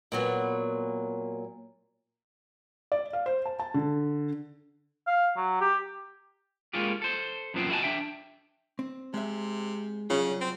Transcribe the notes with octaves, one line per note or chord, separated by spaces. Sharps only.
A#2 F#3 B3
D5
F5
C5
A5
A5
D3
F5
F#3
G4
G#3 A#3 C#4 F4 G4
A4 C5
F#2 A#2 F3 B3 C4
E4 F#4 D#5 F5 G#5 A5
D4 E5 G5
C4
C3 G#3 E5
C2 C#3 F#3 F4
C4